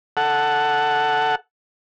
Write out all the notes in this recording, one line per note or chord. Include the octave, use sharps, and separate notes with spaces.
A4 F#5